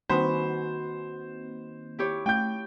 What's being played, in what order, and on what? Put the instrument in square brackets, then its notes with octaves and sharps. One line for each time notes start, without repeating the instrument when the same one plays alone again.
[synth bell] D#3 A#3 C4 [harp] D#4 F#4 B4 [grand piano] C5
[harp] E4 G4 C#5
[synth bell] A3 [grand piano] G5 G6